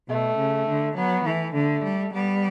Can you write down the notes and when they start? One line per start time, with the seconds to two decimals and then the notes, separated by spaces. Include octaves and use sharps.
0.09 B2 A3
0.38 C#3
0.68 D3
0.96 F#3 B3
1.26 E3 A3
1.55 D3 A3
1.84 G3
2.13 G3 B3